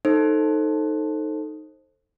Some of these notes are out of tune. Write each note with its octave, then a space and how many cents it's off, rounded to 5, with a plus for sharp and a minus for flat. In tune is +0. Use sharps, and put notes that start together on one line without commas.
D#4 +0 A4 +0 C5 +20